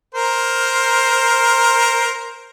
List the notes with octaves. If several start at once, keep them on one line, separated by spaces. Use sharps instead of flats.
A#4 C5